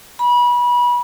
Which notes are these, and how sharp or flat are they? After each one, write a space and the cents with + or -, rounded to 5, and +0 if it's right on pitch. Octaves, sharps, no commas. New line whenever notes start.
B5 -30